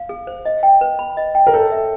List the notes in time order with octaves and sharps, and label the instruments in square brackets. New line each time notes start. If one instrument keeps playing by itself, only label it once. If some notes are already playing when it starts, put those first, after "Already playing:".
Already playing: [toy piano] F5
G#4
C5
D#5
G5
B4
B5
D#5
G5
[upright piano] A#4
[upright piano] A4 [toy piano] C#5
[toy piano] E5